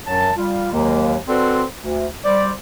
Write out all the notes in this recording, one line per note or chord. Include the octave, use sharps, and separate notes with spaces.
F#2 F#3 A5
G3 F4
D#2 D#3 F#3 G#3 A#3
C4 F#4 A4 B4 C5 D5
D2
G3 C5 D5